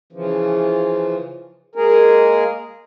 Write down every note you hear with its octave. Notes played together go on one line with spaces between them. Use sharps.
C#3 E3 F3
G#3 A#3 G#4 A#4